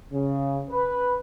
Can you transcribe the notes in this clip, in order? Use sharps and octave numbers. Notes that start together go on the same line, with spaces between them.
C#3
B4